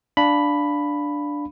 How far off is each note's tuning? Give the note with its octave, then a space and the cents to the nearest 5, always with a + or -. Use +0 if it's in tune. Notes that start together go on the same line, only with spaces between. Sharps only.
D4 +0 F5 +0 B5 +0